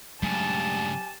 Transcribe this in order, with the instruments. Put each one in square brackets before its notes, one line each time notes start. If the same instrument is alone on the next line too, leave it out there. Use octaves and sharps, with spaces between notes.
[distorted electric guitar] G2 C#3 [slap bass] F#3 G#3 A3 [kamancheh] G4 A5 [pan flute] G#5